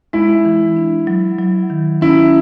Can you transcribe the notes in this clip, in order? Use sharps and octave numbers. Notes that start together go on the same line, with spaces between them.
G#3 E4
E3
D4
F#3
F#3
D#3
C#4 E4